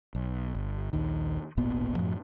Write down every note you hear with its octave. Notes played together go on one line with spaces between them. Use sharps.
B1
G1
A#1 D#2 D#3
D1 G#1 A#2 B3
F#2 A2 F3